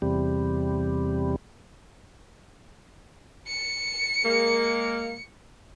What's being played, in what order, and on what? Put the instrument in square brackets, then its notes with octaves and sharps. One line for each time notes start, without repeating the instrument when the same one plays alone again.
[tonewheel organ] E2 C3 G3
[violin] C#7
[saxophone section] G#3 A#3